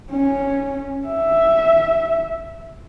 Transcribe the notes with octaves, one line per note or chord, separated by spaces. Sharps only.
C#4
E5